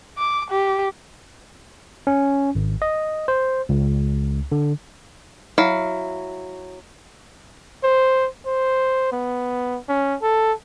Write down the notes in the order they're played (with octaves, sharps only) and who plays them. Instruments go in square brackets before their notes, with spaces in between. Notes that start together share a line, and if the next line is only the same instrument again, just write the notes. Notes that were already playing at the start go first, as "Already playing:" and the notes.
[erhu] D6
G4
[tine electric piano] C#4
G#1
D#5
C5
C#2
D3
[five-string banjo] F#3 E4 F5
[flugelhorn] C5
C5
B3
C#4
A4